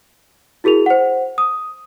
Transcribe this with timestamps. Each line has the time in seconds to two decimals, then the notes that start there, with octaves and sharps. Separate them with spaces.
0.64 E4 F#4 G#4 A#4 F7
0.86 C5 F#5
1.38 D#6